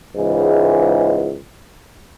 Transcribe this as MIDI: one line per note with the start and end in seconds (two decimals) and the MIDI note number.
0.15 1.36 37
0.15 1.36 44
0.15 1.36 52